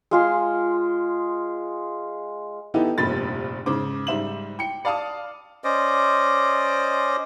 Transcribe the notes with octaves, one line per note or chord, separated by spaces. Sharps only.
G#3 F4 G#4
E3 B3 D#4 E4 G4 A4
F1 A#1 G2 A#2 B5 A6
G#2 C#3 C5 D6
G#2 G3 C5 E5 E7 F#7
G5 C#7
D5 F5 A5 D#6
C#4 C5 D5 D#5